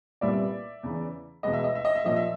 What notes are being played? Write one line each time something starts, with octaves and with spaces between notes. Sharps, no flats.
C2 A#2 G3 B3 D5 E5
E2 C#3 E3
E2 B2 G#3 B3 D#5
E5
D#5
E5
D#5
E5
A#2 F3 A#3 D#5
E5